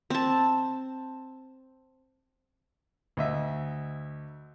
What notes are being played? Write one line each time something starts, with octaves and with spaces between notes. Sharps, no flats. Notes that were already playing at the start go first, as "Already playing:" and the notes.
C4 A5
D2 D#5 E5